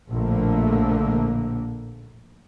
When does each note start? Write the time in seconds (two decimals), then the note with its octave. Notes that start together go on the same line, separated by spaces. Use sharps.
0.11 A#1 A2 D3 A3 A#3